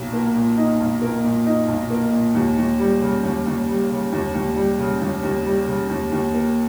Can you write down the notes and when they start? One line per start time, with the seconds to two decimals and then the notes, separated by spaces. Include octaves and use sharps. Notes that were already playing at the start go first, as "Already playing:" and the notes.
Already playing: B1 A#2 D#4
0.13 A#3
0.35 A#2
0.57 D#4
0.80 B1
1.02 A#3
1.24 A#2
1.46 D#4
1.68 B1
1.90 A#3
2.13 A#2
2.34 D#2
2.58 D#2
2.79 G3
3.01 C#3
3.23 D#2
3.46 D#2
3.68 G3
3.90 C#3
4.12 D#2
4.34 D#2
4.56 G3
4.79 C#3
5.01 D#2
5.23 D#2
5.45 G3
5.67 C#3
5.89 D#2
6.12 D#2
6.34 A#3